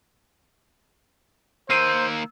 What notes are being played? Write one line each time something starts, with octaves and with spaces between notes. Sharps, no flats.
D#3 A#3 C5 E6 C7 D#7